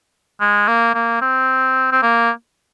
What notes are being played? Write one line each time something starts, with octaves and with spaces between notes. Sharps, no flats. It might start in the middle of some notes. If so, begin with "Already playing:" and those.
G#3
A#3
A#3
C4
C4
A#3